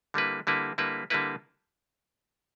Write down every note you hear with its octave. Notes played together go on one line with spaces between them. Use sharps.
D3 G3 A#3 E4 B4
D3 G3 A#3 E4 B4
D3 G3 A#3 E4 B4
D3 G3 A#3 E4 B4